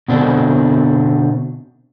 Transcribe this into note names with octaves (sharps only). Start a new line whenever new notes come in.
B2 D3 C4 D4